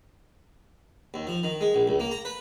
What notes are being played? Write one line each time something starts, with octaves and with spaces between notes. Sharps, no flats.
D#2
F3
D#3
G#3
A#1
C#2
A#3
A#5
B4